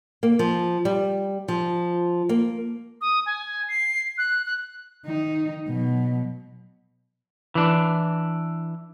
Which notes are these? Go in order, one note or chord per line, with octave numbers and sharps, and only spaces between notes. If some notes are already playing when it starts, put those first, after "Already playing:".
A#3
F3
G3
F3
A#3
D#6
G#5
C7
F#6
F#6
D#3 D#4
B2 F#3
E3 D4